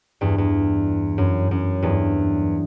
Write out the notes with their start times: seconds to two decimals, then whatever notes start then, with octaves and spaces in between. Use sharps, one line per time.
0.21 E2 G2
0.38 E2
1.18 F#2
1.51 F#2
1.82 E2 G2